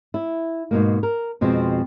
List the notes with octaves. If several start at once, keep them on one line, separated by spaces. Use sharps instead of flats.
E4
G#2 B2 A#3
A#4
F2 B2 F3 G#3 C4